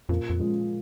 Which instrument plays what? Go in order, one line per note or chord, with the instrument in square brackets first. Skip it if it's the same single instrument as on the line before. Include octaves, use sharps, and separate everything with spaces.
[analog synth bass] F2 [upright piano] A#2
[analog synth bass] F2
[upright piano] F3 G#3